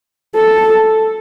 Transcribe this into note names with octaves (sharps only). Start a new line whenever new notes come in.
A4